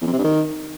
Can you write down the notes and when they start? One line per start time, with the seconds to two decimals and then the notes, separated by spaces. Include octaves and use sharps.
0.01 E2
0.07 F2
0.13 C3
0.18 G2
0.24 D#3